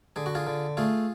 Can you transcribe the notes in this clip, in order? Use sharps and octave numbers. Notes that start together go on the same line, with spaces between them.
D3 G#4
F#4
F4 G#4
D3
A3 F4 G#4